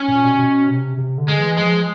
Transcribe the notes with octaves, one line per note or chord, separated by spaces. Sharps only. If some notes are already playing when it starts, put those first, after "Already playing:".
Already playing: C#4
A#2
B2
B2
C3
C3
D3
G#3
E3
F3 G#3